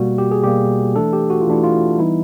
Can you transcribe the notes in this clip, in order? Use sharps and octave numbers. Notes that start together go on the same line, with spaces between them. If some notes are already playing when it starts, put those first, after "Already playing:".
Already playing: B2 G3 A#3 F#4
G4
G#4
B2 G3 A#3 G4
E3 A3 D4 A4
G4
F#4
F4
E3 A3 D4 E4
F4
E3 G3 B3 D#4 E4